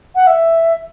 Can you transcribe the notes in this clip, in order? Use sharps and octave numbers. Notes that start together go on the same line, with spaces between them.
F#5
E5